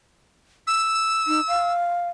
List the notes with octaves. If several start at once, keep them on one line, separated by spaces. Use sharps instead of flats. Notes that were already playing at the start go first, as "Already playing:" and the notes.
E6
D#4
F5